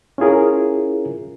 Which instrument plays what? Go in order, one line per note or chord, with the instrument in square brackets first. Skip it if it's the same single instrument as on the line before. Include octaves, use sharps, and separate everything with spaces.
[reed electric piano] C#4 E4 F4 G#4 A#4